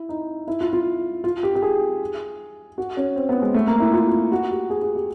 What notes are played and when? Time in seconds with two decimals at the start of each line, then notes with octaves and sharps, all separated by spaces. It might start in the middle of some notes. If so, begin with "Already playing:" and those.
Already playing: E4
0.09 D#4
0.48 E4
0.61 F4
0.73 F4
1.24 F4
1.43 G4
1.55 G4
1.62 G#4
2.78 F#4
2.97 C#4
3.16 C4
3.29 B3
3.42 G#3
3.54 A3
3.67 A#3
3.80 E4
3.93 F4
4.12 F4
4.32 F#4
4.51 G4
4.70 G#4
4.82 G#4
4.95 G4